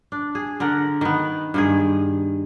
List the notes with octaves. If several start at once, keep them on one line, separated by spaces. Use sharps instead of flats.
D4
G#4
D3 A#4 F#5
D#3 B3
G2 D#3 G#4